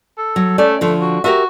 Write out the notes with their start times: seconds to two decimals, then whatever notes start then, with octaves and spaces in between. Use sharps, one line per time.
0.18 A4
0.36 F#3
0.58 A3 C#4 D5
0.81 D3 F3 A3
1.01 F#4
1.24 F#4 G4 A#4 E5